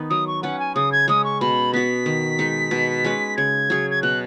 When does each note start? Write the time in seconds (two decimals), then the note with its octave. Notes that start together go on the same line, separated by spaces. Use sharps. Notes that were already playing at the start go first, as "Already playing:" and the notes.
Already playing: D#3 B3 D#4 B4
0.10 F#3 D#6
0.27 C#6
0.43 C#4 B4 F#5
0.59 G#5
0.75 C#3 D#6
0.92 G#6
1.08 G#3 C#4 D#6
1.24 C#6
1.41 B2 B5
1.74 B3 F#4 B6
2.06 D#3
2.39 G#3 D#4
2.71 B2
3.04 G#3 C#4 B4
3.37 C#3 G#6
3.70 F#3 C#4 G#4
3.90 G#6
4.02 B2 F#6